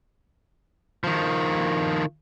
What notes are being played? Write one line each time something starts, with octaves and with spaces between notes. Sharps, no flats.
D#3 F3